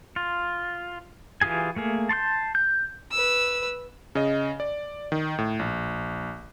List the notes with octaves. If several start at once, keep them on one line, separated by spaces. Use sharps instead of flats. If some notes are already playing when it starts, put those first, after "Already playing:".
F4
E3 F4 G4 G#4 G#5
A3 A#3 G#4
A5 C6 C#6 G6
G6
B4 E6
C#3 D#5
D5
D#3
A2
A#1